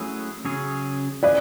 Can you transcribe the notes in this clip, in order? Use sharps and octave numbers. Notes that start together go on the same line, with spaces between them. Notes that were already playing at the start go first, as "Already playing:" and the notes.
Already playing: F#3 A3 C#4 E4 G#4
C#3 F#3 C#4 G#4 C#5
F#3 C#4 E4 G#4 B4 D5